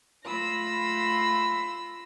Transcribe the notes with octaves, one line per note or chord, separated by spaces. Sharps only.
A3 F4 B5 E6 A#6